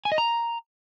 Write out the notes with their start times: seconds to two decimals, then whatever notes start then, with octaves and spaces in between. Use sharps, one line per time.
0.05 G#5
0.12 D#5
0.18 A#5